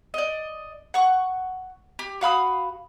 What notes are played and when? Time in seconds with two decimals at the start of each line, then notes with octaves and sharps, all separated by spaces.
0.14 D5 D#5
0.94 F#5 C#6
1.99 G4
2.21 F#4 F5 B5 D#6